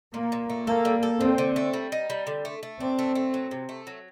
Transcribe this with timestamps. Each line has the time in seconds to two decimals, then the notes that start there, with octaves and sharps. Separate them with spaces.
0.14 A#2 A#3
0.32 A#2
0.50 A3
0.67 A#3 A4
0.85 G3
1.03 A4
1.20 D3 C4
1.38 D3
1.56 A3
1.73 G3
1.92 D#4
2.10 G3
2.27 D3
2.45 A3
2.63 A3
2.80 C4 D4
2.99 A3
3.15 A3
3.34 F#3
3.51 C3
3.69 A3
3.87 F#3